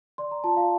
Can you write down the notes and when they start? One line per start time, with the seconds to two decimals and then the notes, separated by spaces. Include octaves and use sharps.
0.18 D5 C6
0.31 A#5
0.44 F4 A5
0.57 F5